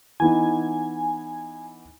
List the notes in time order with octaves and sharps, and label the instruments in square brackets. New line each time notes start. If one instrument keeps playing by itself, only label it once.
[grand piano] E3 B3 D#4 [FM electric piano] G#5